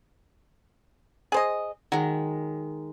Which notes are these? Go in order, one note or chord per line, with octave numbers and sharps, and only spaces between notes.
G#4 C5 D#5
D#3 F#3 G#3